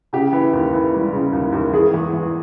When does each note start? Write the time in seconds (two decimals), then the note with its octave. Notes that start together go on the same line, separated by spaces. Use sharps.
0.13 C#3 G4
0.33 E3
0.53 D#2
0.73 E3
0.93 G3
1.13 C#3
1.33 D#2
1.52 D#2
1.73 E2 G#4
1.94 E2
2.13 E2